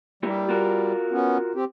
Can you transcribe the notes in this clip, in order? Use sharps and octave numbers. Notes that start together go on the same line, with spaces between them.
G3 A#3 E4 G4
F4 F#4 A#4
B3 C#4
C4 G4